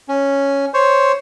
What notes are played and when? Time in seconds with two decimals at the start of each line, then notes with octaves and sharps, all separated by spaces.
0.09 C#4
0.74 C5 C#5